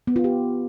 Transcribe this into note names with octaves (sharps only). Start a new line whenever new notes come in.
B3
F4
G4